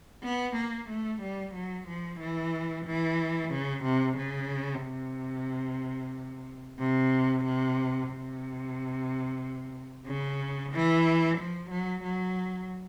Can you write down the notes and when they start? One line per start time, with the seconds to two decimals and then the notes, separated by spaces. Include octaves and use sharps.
0.23 B3
0.56 A#3
0.89 A3
1.22 G3
1.54 F#3
1.88 F3
2.20 E3
2.85 E3
3.51 C#3
3.84 C3
4.16 C#3
4.82 C3
6.79 C3
7.44 C3
8.10 C3
10.07 C#3
10.72 E3
11.38 F3
11.70 F#3
12.04 F#3